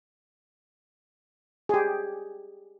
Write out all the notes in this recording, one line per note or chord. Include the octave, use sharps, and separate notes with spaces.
G4 G#4